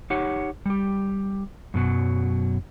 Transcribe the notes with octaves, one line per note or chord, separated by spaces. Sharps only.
D#4 G4 C#5 F#5
G3 G4
F#2 B2 F#3